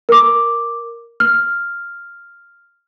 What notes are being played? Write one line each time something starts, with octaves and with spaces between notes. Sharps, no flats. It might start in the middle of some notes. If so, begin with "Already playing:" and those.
A#4 D6
F6